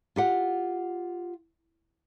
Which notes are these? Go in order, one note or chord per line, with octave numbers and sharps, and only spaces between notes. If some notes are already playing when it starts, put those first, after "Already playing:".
F4 G4 F#5